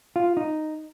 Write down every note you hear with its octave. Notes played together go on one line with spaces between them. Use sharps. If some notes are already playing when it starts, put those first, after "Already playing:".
F4
D#4